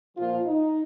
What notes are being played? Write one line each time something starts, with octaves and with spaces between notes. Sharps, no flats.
A#2 F3 F4
D#4